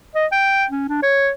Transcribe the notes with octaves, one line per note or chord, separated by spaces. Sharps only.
D#5
G5
C#4
D4
C#5